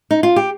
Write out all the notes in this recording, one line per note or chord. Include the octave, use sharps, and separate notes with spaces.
D#4
F4
G4